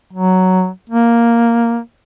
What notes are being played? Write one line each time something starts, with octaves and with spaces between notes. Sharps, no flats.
F#3
A#3